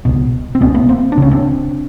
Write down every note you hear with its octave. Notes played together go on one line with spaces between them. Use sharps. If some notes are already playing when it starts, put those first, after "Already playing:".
C#2 B2
C4
C#2 B2 B3 C#4
A3 B3
A#3 C4
D4
C#2 C#3 C#4
C4 D4